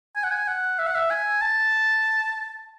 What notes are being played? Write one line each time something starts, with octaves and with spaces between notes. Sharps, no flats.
G#5
F#5
G#5
F#5
E5
F#5
E5
G#5
A5